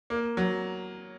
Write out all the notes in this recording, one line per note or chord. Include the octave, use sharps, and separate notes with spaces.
A#3
F#3